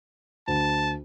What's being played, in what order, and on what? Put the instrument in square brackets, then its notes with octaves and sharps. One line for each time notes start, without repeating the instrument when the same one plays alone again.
[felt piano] D2 [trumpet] A5